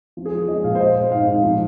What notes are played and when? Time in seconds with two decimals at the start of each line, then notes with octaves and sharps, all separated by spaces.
0.17 F3
0.26 G#4
0.32 G#3 F4
0.48 F3 D#5
0.64 A#2 F5
0.75 C5
0.80 G#3 D#5
0.96 G#3
1.12 G#2 F5
1.28 G#2
1.44 F3